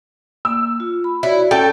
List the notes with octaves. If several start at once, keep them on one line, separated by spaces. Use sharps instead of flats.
A#3 E6
F4
B5
E4 F#4 C#5 D5
C#4 A4 G5